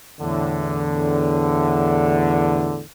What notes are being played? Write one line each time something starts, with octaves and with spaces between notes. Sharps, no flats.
E2 A2 D3